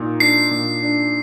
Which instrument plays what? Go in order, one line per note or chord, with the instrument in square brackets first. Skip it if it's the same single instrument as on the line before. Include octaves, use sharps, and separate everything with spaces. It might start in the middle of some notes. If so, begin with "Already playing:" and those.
Already playing: [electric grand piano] A#2 D#4
[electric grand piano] D4 [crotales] C7
[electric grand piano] A#2
D4